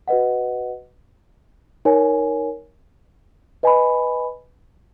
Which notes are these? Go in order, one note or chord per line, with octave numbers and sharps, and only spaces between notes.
F#4 B4 D#5 F#5
D#4 A#4 C#5 G#5
B4 D#5 G#5 B5